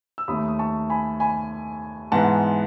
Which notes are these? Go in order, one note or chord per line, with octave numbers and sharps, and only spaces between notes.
E6
D#2 D#3 A3 B5 D#6
D#6
A5 C#6
G#5 B5
G#5 B5
G#2 E3 G#3 B3 F#5 A5